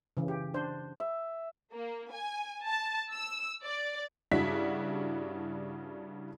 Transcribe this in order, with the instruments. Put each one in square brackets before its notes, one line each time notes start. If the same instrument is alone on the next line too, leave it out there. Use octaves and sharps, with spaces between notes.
[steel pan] C#3 E3
G4
D4 C5
[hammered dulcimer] E5
[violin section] A#3
G#5
A5
E6
D5
[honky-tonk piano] G2 C#3 D4 E4 F#4 B6